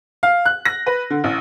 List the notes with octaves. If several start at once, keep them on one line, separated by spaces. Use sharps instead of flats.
F5
F#6
A#6
B4
D3
A1